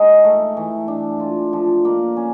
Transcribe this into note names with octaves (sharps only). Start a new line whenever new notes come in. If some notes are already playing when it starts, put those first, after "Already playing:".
Already playing: G#3 D#4
A3
E3
D4
F4
F3
A#3
C#4